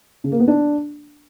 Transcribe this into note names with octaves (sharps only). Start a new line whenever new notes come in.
C#3
A#3
B3
D4